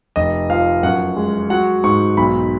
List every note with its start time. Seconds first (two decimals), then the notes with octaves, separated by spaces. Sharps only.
0.16 F1 D#5
0.50 F3 F5
0.83 F#2 F#5
1.16 G#3
1.50 F#3 F#5
1.84 G#2 C#6
2.17 B1 B5